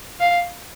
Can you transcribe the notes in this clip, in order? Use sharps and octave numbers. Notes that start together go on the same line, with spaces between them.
F5